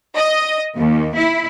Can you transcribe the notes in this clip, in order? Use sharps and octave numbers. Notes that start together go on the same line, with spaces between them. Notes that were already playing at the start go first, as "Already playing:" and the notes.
D#5
D#2
E4